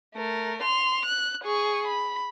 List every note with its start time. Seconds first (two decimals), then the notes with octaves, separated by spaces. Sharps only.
0.15 A3 A#4
0.63 C6 F7
1.06 F#6
1.44 G#4 C#6
1.87 B5